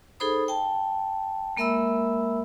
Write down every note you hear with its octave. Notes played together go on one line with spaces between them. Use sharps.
D#4 G#4 A4 C5 B5 D#6
G5 A5
G#3 A#3 A#4 E5 B5 E6